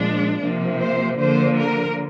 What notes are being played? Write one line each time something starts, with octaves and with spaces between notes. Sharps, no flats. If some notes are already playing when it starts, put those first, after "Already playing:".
Already playing: A#2 F3 G#3 D4
C3 F3 A#3
C5
D3 F3 A#3 C5
A#4